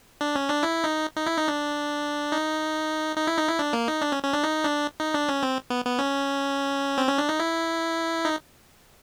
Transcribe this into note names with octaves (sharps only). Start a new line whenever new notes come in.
D4
C#4
D4
E4
D#4
D#4
E4
D#4
D4
D#4
D#4
E4
D#4
E4
D4
A#3
D#4
D4
C#4
C#4
D4
D#4
D4
D#4
D4
C#4
C4
B3
B3
C#4
C4
C#4
D4
D#4
E4
D#4